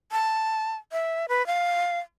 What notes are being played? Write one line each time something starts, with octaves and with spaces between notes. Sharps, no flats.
A5
E5
B4
F5